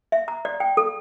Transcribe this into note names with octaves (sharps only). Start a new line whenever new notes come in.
E5
A#5
D5
G5
A4